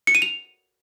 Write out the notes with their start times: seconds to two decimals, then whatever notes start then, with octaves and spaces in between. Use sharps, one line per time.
0.07 C#7
0.15 D#7
0.22 F7